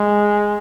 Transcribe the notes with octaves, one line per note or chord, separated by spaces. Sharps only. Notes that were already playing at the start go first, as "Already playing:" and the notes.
Already playing: G#3